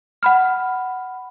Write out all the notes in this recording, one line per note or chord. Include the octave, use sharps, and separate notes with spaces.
F#5 B5 F6